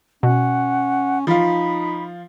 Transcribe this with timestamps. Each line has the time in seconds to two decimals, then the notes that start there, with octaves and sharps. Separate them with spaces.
0.23 B2 C#4 F#5
1.27 F3 D#4 F4 B5